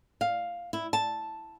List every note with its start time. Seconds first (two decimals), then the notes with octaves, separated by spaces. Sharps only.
0.21 F5
0.73 E4
0.93 A5